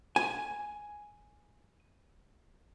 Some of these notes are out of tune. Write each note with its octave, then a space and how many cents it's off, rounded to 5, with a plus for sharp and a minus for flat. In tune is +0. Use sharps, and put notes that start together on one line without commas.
G#5 +0